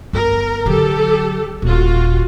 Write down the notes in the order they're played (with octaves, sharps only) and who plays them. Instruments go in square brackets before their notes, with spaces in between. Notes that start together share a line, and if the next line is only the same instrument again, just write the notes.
[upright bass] G1 [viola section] A#4
[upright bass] D3 F#3 [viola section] G4 A4
[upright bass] D#1 [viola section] F4 F#4